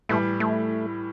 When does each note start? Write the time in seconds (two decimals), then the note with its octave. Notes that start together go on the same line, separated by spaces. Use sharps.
0.09 A2 E3 G3 A3
0.40 A3